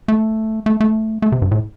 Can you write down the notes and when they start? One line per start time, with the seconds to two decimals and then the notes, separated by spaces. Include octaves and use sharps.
0.08 A3
0.66 A3
0.81 A3
1.22 A3
1.32 C3
1.42 G2
1.51 A2